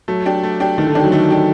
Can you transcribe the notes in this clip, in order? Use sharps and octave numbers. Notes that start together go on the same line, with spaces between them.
F#3 A3
D4 G4
A3
D4 G4
D#3 A3
D3
D#3 F#3 D4 G4
D#3 A3
D4 G4